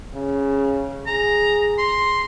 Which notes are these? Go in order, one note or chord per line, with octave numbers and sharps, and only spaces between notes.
C#3
G#4 A#5
C6